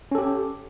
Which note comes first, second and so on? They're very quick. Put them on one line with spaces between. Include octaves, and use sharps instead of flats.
C#4 A4 G4